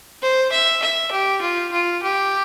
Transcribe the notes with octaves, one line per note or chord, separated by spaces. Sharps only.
C5
E5
E5
G4
F4
F4
G4